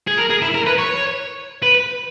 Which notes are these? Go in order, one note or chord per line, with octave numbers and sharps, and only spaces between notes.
G#4
A#4
G#4
E4
A#4
B4
C#5
B4